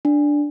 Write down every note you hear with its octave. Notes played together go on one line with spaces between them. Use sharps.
D4